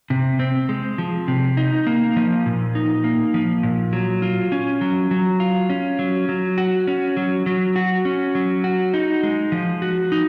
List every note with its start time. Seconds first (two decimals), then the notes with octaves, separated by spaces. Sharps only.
0.10 C3
0.39 C4
0.69 G#3
0.98 F3
1.28 C3
1.57 D#4
1.87 A#3
2.16 F3
2.46 A#2
2.75 D#4
3.04 A#3
3.34 F3
3.63 A#2
3.93 F#3
4.22 F4
4.52 C#4
4.81 F#3
5.11 F#3
5.40 F4
5.70 C#4
5.99 F#3
6.29 F#3
6.58 F#4
6.87 C#4
7.17 F#3
7.46 F#3
7.76 F#4
8.05 C#4
8.35 F#3
8.64 F#4
8.94 D#4
9.23 G#3
9.52 F3
9.82 F#4
10.12 D#4